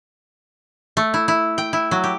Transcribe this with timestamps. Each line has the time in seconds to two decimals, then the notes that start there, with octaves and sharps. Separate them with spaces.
0.97 A3
1.14 E4
1.28 E4
1.58 G5
1.73 E4
1.91 F#3
2.04 G4